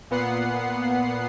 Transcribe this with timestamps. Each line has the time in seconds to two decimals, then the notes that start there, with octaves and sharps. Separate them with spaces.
0.11 A#2 B3 F#5 C7